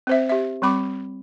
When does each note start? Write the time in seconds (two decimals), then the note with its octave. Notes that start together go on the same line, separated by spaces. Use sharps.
0.07 C4 C5 E5
0.29 G4 E5
0.62 G3 C4 B5 D6